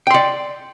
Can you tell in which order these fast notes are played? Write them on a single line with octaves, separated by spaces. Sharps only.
G5 C6 D5